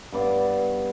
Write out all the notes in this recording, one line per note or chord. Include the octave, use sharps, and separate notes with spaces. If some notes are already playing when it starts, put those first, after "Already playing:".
G2 B3 D5 F5